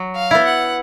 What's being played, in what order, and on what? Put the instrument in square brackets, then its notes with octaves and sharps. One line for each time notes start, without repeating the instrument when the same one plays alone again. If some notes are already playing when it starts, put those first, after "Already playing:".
Already playing: [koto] F#3
[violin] F5
[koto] B3 E4
[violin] F#5